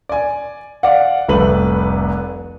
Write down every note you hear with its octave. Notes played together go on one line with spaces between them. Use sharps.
D5 G#5
D5 F5 F#5
F1 C2 A3 B4 F#7